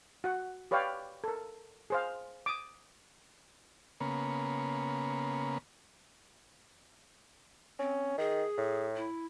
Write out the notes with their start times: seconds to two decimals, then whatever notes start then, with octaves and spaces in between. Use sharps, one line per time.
0.24 F#4 F#5
0.71 G4 B4 C#5 D5 F5 G5
1.24 A4 A#4
1.90 G#4 C5 F5
2.46 D6 D#6
4.00 C#3 A#3 B3
7.79 C4 C#4
8.18 D#3 G#4
8.58 A2
8.96 E4